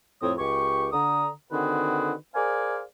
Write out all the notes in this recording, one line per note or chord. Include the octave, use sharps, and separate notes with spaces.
F2 A2 C4 C#5 D#6
C#2 G4 C#6
D3 A#5 D#6
D3 D#3 C4 F#4 G#4 B4
G#4 A#4 C5 D5 F5 G#5